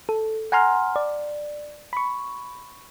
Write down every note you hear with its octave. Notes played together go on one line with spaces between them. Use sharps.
A4
F#5 G#5 A#5 C6 F6
D5
B5 C#6